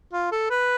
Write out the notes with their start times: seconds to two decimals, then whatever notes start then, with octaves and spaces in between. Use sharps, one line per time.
0.13 F4
0.32 A4
0.50 B4